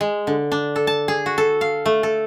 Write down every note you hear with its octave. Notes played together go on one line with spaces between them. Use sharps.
G#3
D3
D4
A4
A5
G#4
F#4
A4
F5
A3
A4